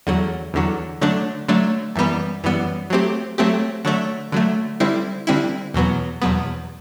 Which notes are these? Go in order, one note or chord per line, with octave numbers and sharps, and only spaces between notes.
E2 D3 F#3
E2 D3 F#3
D3 F#3 A3 D4
D3 F#3 A3 D4
F#2 E3 G3 B3
F#2 E3 G3 B3
F#3 A3 C4 G4
F#3 A3 C4 G4
D3 F#3 A3
D3 F#3 A3
D3 G3 C4 E4
D3 G3 C4 E4
E2 B2 F#3 B3
E2 B2 F#3 B3